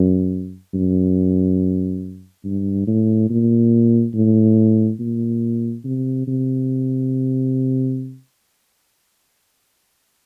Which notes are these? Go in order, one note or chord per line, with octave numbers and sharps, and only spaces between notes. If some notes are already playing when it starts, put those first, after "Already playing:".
Already playing: F#2
F#2
G2
A2
A#2
A2
A#2
C3
C3